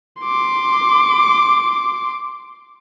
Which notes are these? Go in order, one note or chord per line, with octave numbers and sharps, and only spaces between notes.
C6 D6